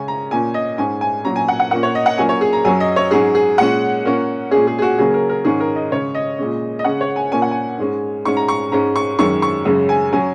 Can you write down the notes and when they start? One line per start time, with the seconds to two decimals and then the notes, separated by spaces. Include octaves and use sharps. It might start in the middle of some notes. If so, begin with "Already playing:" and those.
Already playing: C#3 G#3 C#4 G#5
0.08 A#5
0.31 A#2 A#3 C#4 G#5
0.54 D#5
0.78 G#2 G#3 C#4 G#5
1.01 G#5
1.24 A#2 F#3 C#4 A#5
1.36 G#5
1.48 F#5
1.60 F#5
1.71 A#2 A#3 C#4 F#5
1.83 C#5
1.95 D#5
2.06 F#5
2.18 A#2 F#3 A#3 C#4 G#5
2.29 C#5
2.41 G#4
2.53 A#5
2.65 F#2 F#3 C#4 G#5
2.80 D#5
2.96 C#5
3.11 G#2 F#3 C#4 G#4
3.35 G#4
3.58 A#2 G#3 C#4 F#5
4.04 A#2 A#3 C#4
4.51 A#2 G#3 C#4 G#4
4.67 G#4
4.79 G#4
4.82 F#4
4.98 C#3 F#3 A#3 C#4 G#4
5.14 A#4
5.29 A#4
5.44 G#2 D#3 G#3 C#4 G#4
5.60 A#4
5.76 D#5
5.91 C#3 G#3 C#4 C#5
6.15 D#5
6.38 A#2 G#3 C#4
6.79 D#5
6.84 C#3 G#3 C#4 F#5
7.01 C#5
7.16 G#5
7.32 A#2 A#3 C#4 G#5
7.42 F#5
7.51 G#5
7.78 G#2 G#3 C#4
8.25 G#2 G#3 C#4 C#6
8.37 A#5
8.48 C#6
8.72 G#2 G#3 C#4 A#5
8.96 C#6
9.19 F#2 D#3 G#3 C#4 C#6
9.42 C#6
9.65 F#2 C#3 G#3 C#4
9.89 G#5
10.12 F#3 C#4 G#5